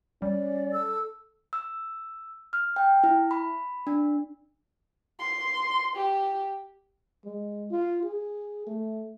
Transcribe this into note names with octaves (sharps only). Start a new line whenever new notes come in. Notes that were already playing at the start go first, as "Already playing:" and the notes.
G3 C#4 D5
A4 E6
E6
F6
G5
E4
B5
D4
C6
G4
G#3
F4
G#4
A3